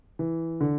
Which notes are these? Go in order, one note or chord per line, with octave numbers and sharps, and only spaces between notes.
E3
D3